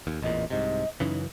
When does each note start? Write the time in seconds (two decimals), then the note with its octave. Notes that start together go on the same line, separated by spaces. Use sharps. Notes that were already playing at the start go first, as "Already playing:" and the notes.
0.07 D#2
0.22 A1 E2 A#2 D#5
0.50 C2 G#2 C3 D#5
1.00 F#2 C#3 E3 D#4